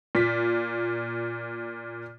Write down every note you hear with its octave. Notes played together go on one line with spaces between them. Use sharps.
A#2 B6